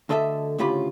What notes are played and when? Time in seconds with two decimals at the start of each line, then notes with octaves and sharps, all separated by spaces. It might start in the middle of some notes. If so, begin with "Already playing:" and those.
0.09 D2 D3 A4 D#5 E5
0.58 D2 A2 C#3 F4 G4 B5